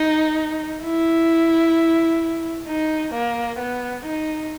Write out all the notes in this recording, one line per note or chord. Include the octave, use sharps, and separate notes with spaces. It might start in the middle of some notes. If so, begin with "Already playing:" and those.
Already playing: D#4
E4
D#4
A#3
B3
D#4